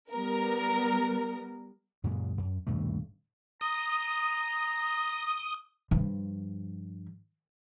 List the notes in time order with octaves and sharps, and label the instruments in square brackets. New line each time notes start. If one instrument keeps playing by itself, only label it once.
[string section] G3 B3 A#4
[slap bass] F#2 A#2 C#3 G#3
F#2
D#1 G2 B2 A3
[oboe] A#5 [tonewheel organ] D#6
[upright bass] G2 F3